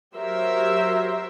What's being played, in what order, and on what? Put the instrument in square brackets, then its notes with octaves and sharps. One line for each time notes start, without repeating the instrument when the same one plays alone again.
[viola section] F#3 G4 A#4 C5 E5